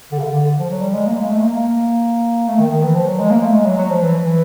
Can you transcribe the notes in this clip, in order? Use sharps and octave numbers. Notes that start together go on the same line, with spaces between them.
D3
C#3
D3
D3
F3
F#3
G3
G#3
A#3
G#3
A3
A#3
A#3
A3
D#3
D#3
E3
F3
F#3
G#3
A#3
A3
G#3
F#3
F#3
F3
E3
E3